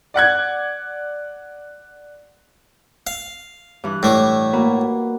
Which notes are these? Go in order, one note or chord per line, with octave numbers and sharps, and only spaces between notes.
D5 F#5 F#6 G#6
F5
G2 E3 F#6
A2 A3 D5
A#3 F#4 B4